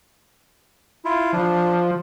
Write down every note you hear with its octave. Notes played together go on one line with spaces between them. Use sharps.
E4 F4
F3 D4